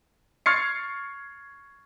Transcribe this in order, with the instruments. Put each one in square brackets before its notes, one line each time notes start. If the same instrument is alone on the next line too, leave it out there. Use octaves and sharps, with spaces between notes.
[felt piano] C#6 F6 G#6 A6 C7 C#7